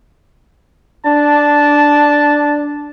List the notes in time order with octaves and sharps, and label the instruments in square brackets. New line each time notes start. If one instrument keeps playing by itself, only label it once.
[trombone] D4 [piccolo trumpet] A5